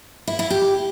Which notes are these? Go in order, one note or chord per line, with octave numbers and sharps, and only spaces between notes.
E4
E4
G4